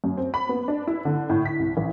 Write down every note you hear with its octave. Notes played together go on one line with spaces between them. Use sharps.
F#2
C4
B5
B3
D4
E4
D3
A2
B6
C2
A1